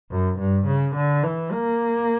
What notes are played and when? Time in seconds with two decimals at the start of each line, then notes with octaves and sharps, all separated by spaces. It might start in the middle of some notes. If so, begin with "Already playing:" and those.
0.11 F#2
0.39 G2
0.67 C#3
0.95 D3
1.23 E3
1.52 A#3